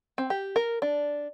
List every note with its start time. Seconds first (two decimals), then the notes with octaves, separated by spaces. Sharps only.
0.18 C4
0.30 G4
0.56 A#4
0.82 D4